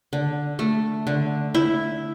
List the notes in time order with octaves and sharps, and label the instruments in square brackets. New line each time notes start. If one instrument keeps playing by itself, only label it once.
[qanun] D3
A3
D3
E4